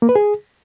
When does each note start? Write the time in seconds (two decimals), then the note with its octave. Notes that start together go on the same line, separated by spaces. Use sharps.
0.02 A#3
0.09 B4
0.15 G#4